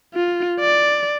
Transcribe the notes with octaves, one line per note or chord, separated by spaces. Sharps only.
F4
D5